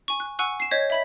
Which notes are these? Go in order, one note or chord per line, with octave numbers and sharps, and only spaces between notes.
G#5 C#6
F#6
F#5 G#5 C#6 E6 F#6
C7 E7
C#5 D#5 G6 G#6 B6
E5 B5 B6